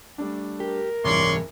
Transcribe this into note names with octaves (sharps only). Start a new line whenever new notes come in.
G3 A3 D4
G4 A#4
F#1 C2 G#2 C3 E3 C#5 D5 C6